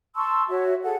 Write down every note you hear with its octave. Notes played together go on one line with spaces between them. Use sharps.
A5 C6 C#6 E6
F#4 C#5 E5
G#4 A4 F#5